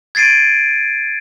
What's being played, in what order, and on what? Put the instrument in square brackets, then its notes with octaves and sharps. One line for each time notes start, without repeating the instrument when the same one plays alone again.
[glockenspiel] G#6 A6 C7 D7 D#7